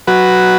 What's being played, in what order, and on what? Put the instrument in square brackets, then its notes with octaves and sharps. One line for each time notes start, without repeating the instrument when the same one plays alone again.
[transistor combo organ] F#3 F#4 B4